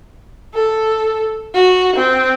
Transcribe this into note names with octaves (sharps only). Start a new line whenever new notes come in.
A4
F#4
C4